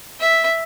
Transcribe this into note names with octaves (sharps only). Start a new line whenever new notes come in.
E5